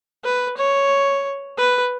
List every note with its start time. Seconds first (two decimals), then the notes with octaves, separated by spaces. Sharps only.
0.24 B4
0.57 C#5
1.57 B4